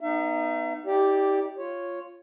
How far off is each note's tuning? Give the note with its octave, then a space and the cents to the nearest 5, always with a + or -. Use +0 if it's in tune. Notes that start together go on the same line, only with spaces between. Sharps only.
B3 +0 D#4 -10 E5 +40
D#4 +35 G4 +0 D5 -5
F4 +0 C#5 -5